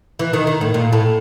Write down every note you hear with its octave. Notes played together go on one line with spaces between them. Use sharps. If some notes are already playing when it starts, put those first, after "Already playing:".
E3
D#3
D#3
A2
A#2
A2